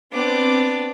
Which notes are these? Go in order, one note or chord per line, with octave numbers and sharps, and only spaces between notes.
B3 C4 D4 D6